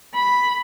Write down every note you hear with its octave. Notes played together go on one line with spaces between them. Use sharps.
B5